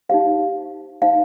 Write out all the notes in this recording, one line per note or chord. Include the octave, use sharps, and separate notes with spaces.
D#4 G4 C5 F5
D#4 C5 F5